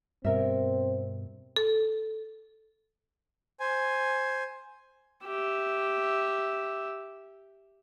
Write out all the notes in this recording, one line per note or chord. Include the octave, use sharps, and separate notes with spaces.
G2 B2 C4 A#4 E5
A4
C5 G#5
G4 E5